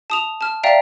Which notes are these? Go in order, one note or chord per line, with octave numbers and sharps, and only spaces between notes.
A5 D#6 F7
A5 F6
D5 E5 F5 G5 A#5